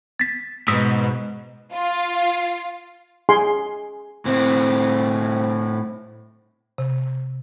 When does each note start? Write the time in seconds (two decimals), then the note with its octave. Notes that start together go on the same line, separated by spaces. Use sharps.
0.20 A6 B6
0.68 G#2 B2 D#6 E6 B6
1.73 F4
3.29 G#4 G#5 C6
4.25 A2 C4
6.78 C3